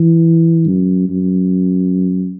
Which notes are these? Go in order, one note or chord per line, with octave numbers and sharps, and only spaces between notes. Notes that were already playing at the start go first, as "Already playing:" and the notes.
Already playing: E3
F#2
F#2